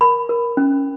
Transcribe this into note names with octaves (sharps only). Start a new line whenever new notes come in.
A#4 B5
A#4
C#4